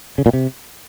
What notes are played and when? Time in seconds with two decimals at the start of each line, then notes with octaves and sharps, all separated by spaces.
0.18 C#3
0.26 A#2
0.33 C3